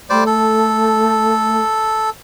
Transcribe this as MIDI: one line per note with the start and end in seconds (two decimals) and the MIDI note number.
0.10 0.24 55
0.10 1.61 57
0.10 0.24 72
0.10 0.24 74
0.26 2.10 69